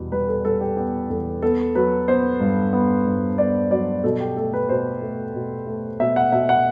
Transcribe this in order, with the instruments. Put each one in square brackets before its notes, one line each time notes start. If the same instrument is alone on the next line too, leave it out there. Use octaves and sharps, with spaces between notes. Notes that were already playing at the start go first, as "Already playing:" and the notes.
Already playing: [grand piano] E2 B2 G3
G3 B4
A4
G3 A4
G4
B3 G4
E2 A4
B3 A4
F#3 B4
B3 C5
G2
B3
G2
B3 D5
F#3 D5
B2 A4
G4
A3 A4
B4
B2 C5
A3
B2
A3
B2 E5
F#5
B2 E5
F#5